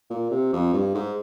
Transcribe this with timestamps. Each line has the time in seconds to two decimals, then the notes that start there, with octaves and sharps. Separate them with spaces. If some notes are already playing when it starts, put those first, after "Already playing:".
0.10 A#2
0.31 C3
0.53 F2
0.73 G2
0.95 G#2